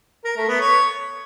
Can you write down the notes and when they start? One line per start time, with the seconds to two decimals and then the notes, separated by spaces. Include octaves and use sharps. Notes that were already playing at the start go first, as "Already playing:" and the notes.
0.25 A#4
0.36 A3
0.48 B3
0.60 C#5